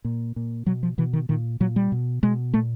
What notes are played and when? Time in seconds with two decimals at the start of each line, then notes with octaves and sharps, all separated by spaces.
0.05 A#2
0.36 A#2
0.66 B2 F#3
0.83 F3
0.98 B2 E3
1.13 D#3
1.29 A#2 D#3
1.60 A#2 F#3
1.76 G3
1.92 B2
2.23 B2 G#3
2.54 A#2 A3